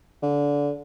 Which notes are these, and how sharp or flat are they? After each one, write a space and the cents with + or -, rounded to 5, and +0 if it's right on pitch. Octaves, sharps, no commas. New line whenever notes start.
D3 -25